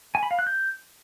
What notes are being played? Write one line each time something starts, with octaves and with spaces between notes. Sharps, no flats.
G#5
B5
F5
F#6
G6